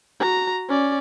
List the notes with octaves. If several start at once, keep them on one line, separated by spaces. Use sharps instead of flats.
F#4 A#5
C#4 D5